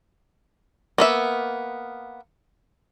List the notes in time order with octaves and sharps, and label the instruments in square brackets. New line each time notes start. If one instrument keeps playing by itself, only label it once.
[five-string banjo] A#3 B3 E5